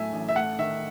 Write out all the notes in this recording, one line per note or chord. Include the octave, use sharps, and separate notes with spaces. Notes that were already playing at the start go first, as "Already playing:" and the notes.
Already playing: A2 F#3 A3 E5 G#5
A1
E5
A3 F#5
D#3 E5